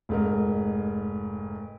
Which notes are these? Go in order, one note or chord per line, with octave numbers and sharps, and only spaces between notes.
F1 G#2 A#4